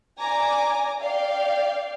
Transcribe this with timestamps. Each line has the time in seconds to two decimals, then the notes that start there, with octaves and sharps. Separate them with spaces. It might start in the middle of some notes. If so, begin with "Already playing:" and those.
0.18 D5 G#5 A#5 D6
0.98 D5 F5 G5